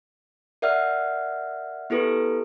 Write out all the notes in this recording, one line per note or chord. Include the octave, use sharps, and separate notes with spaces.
A#4 D5 E5 F#5 F6
B3 E4 G4 A4 B4